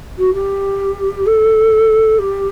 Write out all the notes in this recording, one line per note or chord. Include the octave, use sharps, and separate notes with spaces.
F#4
G4
A4
G4